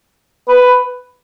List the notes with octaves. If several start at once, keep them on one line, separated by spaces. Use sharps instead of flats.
B4